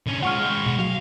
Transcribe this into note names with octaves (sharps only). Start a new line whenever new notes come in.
D3 C#4
G#3 F4 F#5 C#6 F6
G#3 G5
B2
F#3 F5